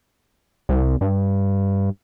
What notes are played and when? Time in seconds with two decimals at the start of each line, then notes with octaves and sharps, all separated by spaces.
0.69 C2
1.01 G2